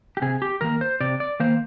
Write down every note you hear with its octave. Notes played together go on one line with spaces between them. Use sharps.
G4
C3 G#4
G4
D#3 A#3 A#4
C5
C3 D5
D5
D#3 A#3 C5